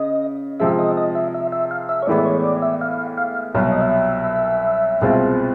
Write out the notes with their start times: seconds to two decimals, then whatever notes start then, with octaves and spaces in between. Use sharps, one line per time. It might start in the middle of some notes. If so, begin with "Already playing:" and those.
Already playing: C#3 D#5
0.60 C3 F3 G#3 E5
0.79 D#5
0.97 D#5
1.15 E5
1.34 E5
1.52 E5
1.71 F5
1.89 E5
2.02 C#5
2.07 A2 E3 G#3 B3 D5
2.25 C#5
2.44 D5
2.62 E5
2.81 F5
3.18 F5
3.54 C2 B2 F#3 F5
3.63 E5
3.72 D#5
3.81 E5
5.01 C2 B2 G#3 C4 F4